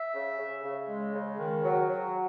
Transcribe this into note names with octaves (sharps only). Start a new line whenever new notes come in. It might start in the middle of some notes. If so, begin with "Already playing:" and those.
Already playing: E5
C#3
C#3
C#3
G#3
C#3
D#3
F#3
F#3